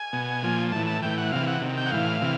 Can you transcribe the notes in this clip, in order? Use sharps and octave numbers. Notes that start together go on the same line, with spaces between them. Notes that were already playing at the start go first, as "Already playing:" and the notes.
Already playing: G#5
B2
A#2 F3
A2 E3 A5
A5
A2 E3 G5
F#5
C3 E3 F5
F#5
C3 D#3
G5
F#5
A2 E3 F5
C3 E3